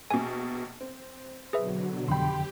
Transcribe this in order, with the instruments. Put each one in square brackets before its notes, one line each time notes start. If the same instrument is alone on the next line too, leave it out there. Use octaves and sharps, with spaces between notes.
[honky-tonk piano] A#1 B2 [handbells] G#5
[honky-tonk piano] C4
[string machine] B2 D3 F#3 [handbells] G#4 B4 E5
[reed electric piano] F2 D3 G5 [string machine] G4 [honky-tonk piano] B5 C6